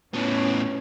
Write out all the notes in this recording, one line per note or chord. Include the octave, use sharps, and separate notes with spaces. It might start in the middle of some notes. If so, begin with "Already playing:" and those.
A2 B3 C#4